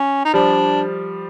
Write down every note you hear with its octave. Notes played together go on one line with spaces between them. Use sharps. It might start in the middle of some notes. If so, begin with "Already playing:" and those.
Already playing: C#4
D#4
F3 G3 D4